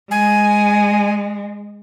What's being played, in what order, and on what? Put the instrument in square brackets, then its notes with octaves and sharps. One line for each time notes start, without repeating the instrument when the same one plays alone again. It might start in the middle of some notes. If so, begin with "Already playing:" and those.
[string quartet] G#3 [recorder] G#5